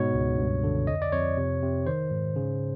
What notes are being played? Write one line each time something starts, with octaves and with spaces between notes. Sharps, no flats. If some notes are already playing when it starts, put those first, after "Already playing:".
Already playing: G#2 B2 C#5
C#2
G2
D3
F2 D#5
D5
F2 C#5
C3
C3
D#3 C5
G#2
C#3